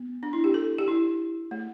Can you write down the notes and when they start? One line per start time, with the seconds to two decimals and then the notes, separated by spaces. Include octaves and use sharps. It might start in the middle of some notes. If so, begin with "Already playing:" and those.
Already playing: B3
0.23 D4
0.33 E4
0.44 G4
0.54 A4
0.79 G4
0.88 E4
1.51 A3